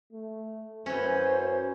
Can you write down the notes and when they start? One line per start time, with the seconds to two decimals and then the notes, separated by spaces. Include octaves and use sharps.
0.13 A3
0.86 F#2 E3 C#4 C5